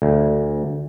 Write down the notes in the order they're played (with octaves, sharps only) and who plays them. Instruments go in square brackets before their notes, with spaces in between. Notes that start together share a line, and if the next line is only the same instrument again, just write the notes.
[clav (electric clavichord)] D2